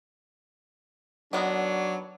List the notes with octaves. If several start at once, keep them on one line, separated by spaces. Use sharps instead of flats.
D#3 F#3 B3 D4 A#4